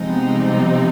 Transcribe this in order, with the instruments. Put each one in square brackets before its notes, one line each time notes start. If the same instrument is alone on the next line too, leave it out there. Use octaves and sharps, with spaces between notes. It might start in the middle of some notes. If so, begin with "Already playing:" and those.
Already playing: [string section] C3 F3 C4 D#4 [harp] G#3
[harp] B3
G#3
G3
B3
G3